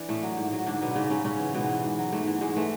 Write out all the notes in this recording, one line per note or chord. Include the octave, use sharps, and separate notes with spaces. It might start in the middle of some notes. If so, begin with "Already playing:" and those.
Already playing: E3 D4
A2 A3
F#3
G#2
F#3
G#2 D3 D4
B2 F#3 B3
G#2 C#3 C#4
C#3 F#3 C#4
G#2 C#3 C#4
E3
G#2 B2 B3
E3
G#2
F#3
G#2 A3
E3
G#2 G#3
E3 A3